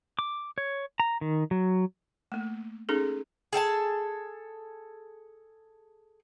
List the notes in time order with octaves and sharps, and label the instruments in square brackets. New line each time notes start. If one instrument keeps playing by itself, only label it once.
[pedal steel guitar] D6
C#5
A#5
D#3
F#3
[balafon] A3 A#3
C#4 D#4 G#4 A4
[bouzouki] G#4 A4 G5 A5